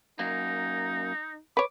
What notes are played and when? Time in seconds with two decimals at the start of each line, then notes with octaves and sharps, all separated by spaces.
0.19 F#2 A#3 D#4
1.57 B4 C#5 D6